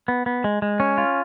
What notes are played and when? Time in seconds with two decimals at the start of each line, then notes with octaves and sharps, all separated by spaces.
0.08 B3
0.26 B3
0.44 G#3
0.62 G#3
0.80 C#4
0.98 F4